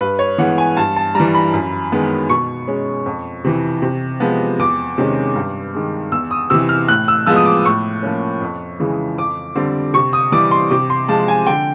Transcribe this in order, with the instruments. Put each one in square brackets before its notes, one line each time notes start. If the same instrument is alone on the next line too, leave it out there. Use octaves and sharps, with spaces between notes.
[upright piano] G2 B4
C#5
E3 G#3 B3 F#5
G#5
G2 A5
A5
E3 G3 A#5
B5
F#2
D#3 G#3 B3
B2 C#6
G#3 C#4
F2
C3 E3
C3
F3 G#3 B3
E2 D6
C3 D#3 G#3 C#4
G2
D#3 G#3
E2 E6
D#6
C3 E3 E6
F6
A2 F#6
E6
F3 G#3 B3 E6
D#6
D6
A2 C#6
F3 A#3 C#4
F2
C#3 E3 G#3
F2 D6
D3 G3 C4
C3 C#6
D#6
E3 G3 D6
C6
C3 D6
C6
F3 G#3 A5
G#5
D3 G5